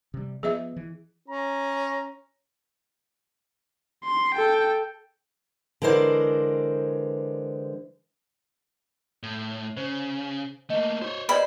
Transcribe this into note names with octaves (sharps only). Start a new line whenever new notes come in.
C3 G3
F3 B3 G#4 D#5 E5
E3
C#4 A#5
C6
A4 G5
D3 E3 G#3 A#4 C5 D5
A2
C#3 C5
A3 A#3 D#5
F#4 C5 C#5
B4 C5 D5 D#5 B5